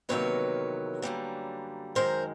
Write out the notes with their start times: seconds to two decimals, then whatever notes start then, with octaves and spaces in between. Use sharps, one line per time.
0.09 E2 C3 D#3 F#3 A#3 B4 C#5
1.02 F#2 D3 G3 A#3
1.95 F#2 D#3 G#3 A#4 C5